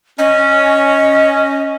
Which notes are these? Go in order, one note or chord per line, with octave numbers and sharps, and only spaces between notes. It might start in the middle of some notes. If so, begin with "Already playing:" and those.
C#4 D#5